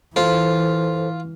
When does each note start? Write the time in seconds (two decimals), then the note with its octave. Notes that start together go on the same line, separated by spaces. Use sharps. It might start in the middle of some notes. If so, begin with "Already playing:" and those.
0.16 E3 F4 A4 C5